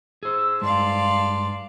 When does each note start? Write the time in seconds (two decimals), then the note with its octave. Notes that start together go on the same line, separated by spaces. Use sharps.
0.23 G#4 C5 E6
0.62 G2 G#3 D5 F5 A5 C6